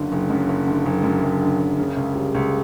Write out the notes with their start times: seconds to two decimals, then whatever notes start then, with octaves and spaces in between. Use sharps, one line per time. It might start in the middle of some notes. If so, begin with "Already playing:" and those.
Already playing: F#1 F#2 D3
0.12 F#1
0.30 F#2
0.49 F#1
0.67 D3
0.86 F#1
1.03 F#2
1.23 F#1
1.41 D3
1.59 F#1
1.79 C#3
1.97 C#2
2.15 G3
2.35 C#2